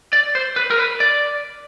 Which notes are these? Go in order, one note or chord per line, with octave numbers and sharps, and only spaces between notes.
D5
C5
B4
A#4
B4
D5